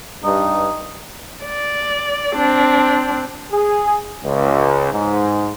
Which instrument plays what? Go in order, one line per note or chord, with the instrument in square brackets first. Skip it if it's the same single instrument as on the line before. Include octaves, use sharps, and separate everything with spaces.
[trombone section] G2 [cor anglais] D#4
[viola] D5
C4 D4
[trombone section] G#4
C#2
G#2